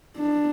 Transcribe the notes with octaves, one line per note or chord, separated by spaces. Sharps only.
D4